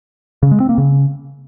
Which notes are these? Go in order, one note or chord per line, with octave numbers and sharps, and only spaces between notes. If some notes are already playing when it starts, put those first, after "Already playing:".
C#3
G#3
C4
A#3
C#3